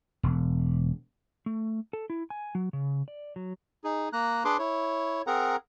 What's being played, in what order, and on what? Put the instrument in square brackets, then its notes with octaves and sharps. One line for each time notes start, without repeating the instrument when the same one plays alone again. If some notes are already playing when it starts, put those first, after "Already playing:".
[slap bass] E1
[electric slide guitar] A3
A4
E4
G#5
F#3
C#3
D5
F#3
[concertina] D#4 G#4
A#3 A#5 F#6
D4 G#4 B4 C6 D6
E4 C#5
C4 G#4 A#4 F#5 A#5